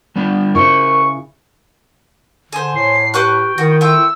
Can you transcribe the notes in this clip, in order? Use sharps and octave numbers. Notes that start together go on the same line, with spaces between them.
G3 B3 D4
C#3 E4 A#4 C5 C#6
D3 G#4 C5
A2 C#5 C7
G4 B4 G5 C#6 F#6
D#3 E4 F#4
A3 F4 G5 E6